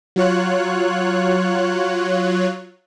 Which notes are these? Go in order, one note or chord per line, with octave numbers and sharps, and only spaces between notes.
F#3 F4 C#5 F#6